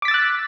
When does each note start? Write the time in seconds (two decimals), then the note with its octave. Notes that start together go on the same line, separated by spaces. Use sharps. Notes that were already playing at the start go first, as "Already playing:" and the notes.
0.02 D6
0.05 B6
0.08 A6
0.11 E6
0.14 F#6